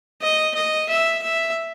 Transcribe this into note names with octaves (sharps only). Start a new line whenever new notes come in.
D#5
D#5
E5
E5